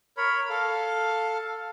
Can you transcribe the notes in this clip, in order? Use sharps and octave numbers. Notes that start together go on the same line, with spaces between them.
A#4 C#5 B5
A4 F5